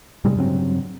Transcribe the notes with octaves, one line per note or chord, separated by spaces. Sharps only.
A2 C3 G3 G#3
G2 C#3 F#3 C4